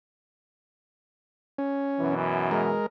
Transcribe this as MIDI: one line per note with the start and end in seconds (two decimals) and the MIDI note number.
1.58 2.15 61
2.00 2.76 42
2.00 2.76 47
2.00 2.76 52
2.51 2.86 56
2.51 2.86 70